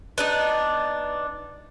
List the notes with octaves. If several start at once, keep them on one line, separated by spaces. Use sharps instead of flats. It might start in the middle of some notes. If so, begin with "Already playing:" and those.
B3 D4 D#4